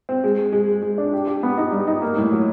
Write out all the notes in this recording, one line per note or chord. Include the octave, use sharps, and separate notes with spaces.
C4
G#3
G#3
G#3
G#3
G#3
D4
G4
G4
B3
D#4
G3
D#4
A#3
A2
F#3